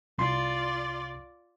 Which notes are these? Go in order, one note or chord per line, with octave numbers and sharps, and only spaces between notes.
C2 F4 D5 C6